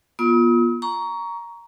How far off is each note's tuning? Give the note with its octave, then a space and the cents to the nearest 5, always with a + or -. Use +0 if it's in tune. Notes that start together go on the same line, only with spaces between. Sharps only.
B3 -40 F4 +0 D#6 +45
A#5 +5 C#6 +20